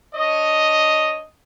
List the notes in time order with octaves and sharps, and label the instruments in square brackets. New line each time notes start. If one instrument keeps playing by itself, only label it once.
[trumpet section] D4 C#5 D#5